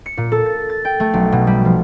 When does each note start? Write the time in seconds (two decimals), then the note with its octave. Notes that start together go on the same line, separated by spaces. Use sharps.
0.06 C#7
0.17 A#2
0.32 A4
0.46 A6
0.69 A6
0.85 G5
1.00 A3
1.13 B1
1.32 B2
1.47 G3
1.65 F3